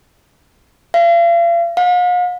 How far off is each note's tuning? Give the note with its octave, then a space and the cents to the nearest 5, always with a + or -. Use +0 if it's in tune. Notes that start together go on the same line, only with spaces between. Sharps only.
F5 -40
F5 +45